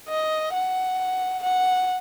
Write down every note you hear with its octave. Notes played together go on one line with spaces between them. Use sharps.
D#5
F#5
F#5